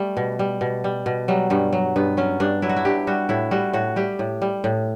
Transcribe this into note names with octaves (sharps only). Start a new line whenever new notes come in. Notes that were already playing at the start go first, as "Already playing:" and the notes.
Already playing: G3 A3
B2
G3
B2
G3
B2
F#3 G3
G2 G3
F#3
G2 B3
F#3 C#4
G2 D4
F#3 E4
F#4
E4
G2 G4
G3 F#4
A2 E4
G3 F#4
A2 F#4
G3 G4
A2
G3
A2